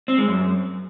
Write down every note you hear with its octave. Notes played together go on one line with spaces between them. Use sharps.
C4
G#3
F#2